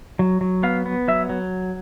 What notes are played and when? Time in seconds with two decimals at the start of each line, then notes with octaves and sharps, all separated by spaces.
0.19 F#3
0.41 F#3
0.63 B3 F5
0.86 B3
1.08 F#3 E5
1.29 F#3